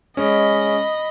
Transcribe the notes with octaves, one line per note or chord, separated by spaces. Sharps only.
G#3 C#4 D#5 B5